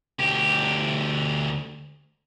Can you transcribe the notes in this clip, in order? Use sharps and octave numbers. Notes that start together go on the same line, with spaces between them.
D2 G4